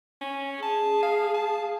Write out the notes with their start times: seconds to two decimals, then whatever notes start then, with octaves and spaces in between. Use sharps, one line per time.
0.21 C#4
0.63 G#4 A5
1.03 F5
1.34 A5